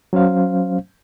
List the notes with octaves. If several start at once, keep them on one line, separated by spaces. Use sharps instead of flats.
F#3 C#4 C5 F5